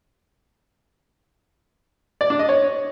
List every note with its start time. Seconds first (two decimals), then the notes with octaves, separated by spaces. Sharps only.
2.21 D5
2.30 D4
2.39 D#5
2.49 C#5